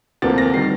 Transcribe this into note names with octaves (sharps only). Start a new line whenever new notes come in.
D2 C3 F3 A#3 A6
A#6
D#3 G3 C7